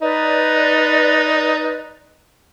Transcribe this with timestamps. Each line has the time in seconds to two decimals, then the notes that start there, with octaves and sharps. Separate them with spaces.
0.01 D#4 B4 D5